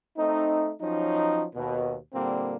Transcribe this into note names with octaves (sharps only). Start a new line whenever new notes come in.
A3 C4 D#4
F3 F#3 C#4 D#4
D#2 B2
A#2 D3 G3 A#3 C4